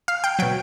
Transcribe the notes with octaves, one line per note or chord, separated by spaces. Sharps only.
F5
G5
B2 F#3 G5